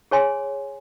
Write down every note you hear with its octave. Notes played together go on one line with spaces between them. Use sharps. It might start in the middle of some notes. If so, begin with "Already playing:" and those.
G#4 C#5 G#5 C6